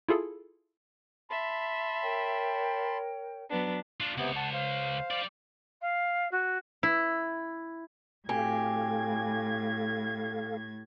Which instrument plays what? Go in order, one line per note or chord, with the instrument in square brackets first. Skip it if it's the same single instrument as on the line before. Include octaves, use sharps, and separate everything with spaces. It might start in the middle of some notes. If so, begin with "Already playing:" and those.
[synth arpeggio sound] E4 F4 G#4 A4
[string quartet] E5 [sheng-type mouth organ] A5 B5 C6
[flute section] A#4 C#5 G5
[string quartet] F#3 B3 D4
[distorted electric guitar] D4 F4
[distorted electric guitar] C#2 [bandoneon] C3 B3
[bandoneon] F#5 A5
C5 F5
[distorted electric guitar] G3 D5
[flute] F5
F#4
[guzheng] E4
[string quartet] A2 G#6 [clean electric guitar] C4 F#4 G#5 [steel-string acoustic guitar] G4 [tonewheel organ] A4 F5